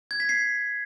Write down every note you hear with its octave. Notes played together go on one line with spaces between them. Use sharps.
G#6
B6
C7